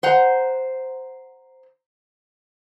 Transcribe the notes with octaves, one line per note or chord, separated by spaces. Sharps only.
C5 F#5 A#5